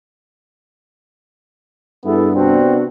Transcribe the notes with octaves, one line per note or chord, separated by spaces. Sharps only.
G2 B3 E4 G#4 A4
C3 B3 C4 D4 F#4